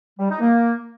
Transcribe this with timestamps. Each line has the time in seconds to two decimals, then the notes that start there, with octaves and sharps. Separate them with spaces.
0.20 G3
0.30 D#4
0.40 A#3